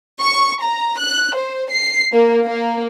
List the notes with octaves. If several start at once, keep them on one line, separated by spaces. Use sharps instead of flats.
C#6
A#5
F#6
C5
C7
A#3
A#3